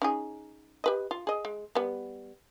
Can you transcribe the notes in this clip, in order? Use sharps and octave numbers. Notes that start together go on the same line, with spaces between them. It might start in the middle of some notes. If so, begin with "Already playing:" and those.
C#4 D#4 G#4
G4 B4 D#5
F4
G#4 D#5
G#3
G3 B3